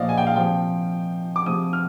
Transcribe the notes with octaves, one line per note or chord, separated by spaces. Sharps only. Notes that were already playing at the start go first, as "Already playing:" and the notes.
Already playing: A#2 F3 C5 D5 D#5 F5
G#5
G5
F5
C3 F3 G5
D6
C3 F3 D#6
F6